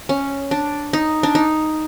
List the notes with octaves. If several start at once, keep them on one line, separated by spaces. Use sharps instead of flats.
C#4
D4
D#4
D4
D#4